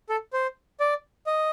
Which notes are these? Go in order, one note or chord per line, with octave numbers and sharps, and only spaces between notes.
A4
C5
D5
D#5